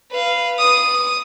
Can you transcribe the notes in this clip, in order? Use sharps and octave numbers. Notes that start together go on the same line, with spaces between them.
B4 F5
D#6